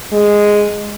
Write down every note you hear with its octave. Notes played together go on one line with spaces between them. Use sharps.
G#3